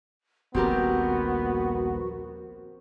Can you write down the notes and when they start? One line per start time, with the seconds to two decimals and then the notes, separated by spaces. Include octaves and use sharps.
0.54 D#1 A#1 B3 C4 F#4 G4 A#4